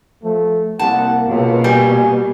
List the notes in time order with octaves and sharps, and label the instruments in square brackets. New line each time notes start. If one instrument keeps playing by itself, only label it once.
[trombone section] F3 A3
[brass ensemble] C2 F#5 [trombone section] A#3 [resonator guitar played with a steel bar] A5
[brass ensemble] C#2 [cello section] B2
[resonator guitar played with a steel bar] G3 [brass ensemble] G#5